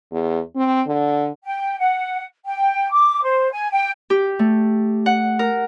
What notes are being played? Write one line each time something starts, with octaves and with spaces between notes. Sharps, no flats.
E2
C4
D3
G5
F#5
G5
D6
C5
G#5
G5
G4
A3
F#5
A#4